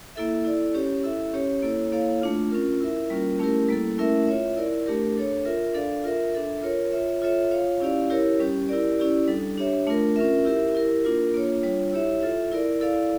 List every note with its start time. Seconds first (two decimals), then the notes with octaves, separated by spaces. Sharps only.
0.15 A#3 E4 A4 E5
0.45 E4 A4 D5
0.74 C#4 G4 C#5
1.04 E4 A4 E5
1.33 C#4 G4 C#5
1.63 A#3 E4 A4 C#5
1.92 A#3 E4 A4 C#5 F5
2.21 A3 D4 F4
2.51 C#4 F4 A#4
2.80 E4 A#4 E5
3.10 G3 A#3 C#4 F4 A#4
3.39 A3 C#4 E4 G4 A#4
3.69 G3 A#3 E4 A4
3.98 A3 C#4 E4 A#4 E5
4.27 F4 C#5 E5
4.57 E4 A#4 D5
4.86 A3 D4 G4 A#4
5.16 D4 A4 C#5
5.45 F4 A#4 E5
5.74 D4 A4 D5 F5
6.04 F4 A#4 E5
6.33 D4 A4 E5
6.63 F4 A#4 C#5
6.92 F4 C#5 E5
7.22 F4 A4 C#5 E5
7.51 F4 C#5 F5
7.80 C#4 E4 G4 D5 F5
8.10 E4 G4 A#4 C#5
8.40 G3 C#4 G4
8.69 E4 G4 A#4 D5
8.98 C#4 E4 G4 D5
9.28 G3 D4 A4
9.57 D4 G4 C#5 E5
9.87 A3 D4 F4 A#4
10.16 C#4 F4 A#4 E5
10.45 E4 G4 A#4 E5
10.75 E4 G4 A#4
11.04 A#3 D4 F4 A#4
11.34 A#3 D4 F4 C#5
11.63 G3 D4 F4 C#5
11.93 E4 G4 C#5 E5
12.22 F4 A4 E5
12.52 E4 A#4 D5
12.81 E4 A4 D5 F5